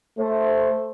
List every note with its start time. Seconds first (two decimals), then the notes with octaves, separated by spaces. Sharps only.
0.19 A3 C5